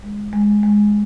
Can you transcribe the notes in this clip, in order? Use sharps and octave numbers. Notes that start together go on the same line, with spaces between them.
G#3
G#3
G#3